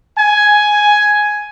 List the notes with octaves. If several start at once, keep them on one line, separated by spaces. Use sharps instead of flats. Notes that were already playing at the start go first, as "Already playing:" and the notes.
G#5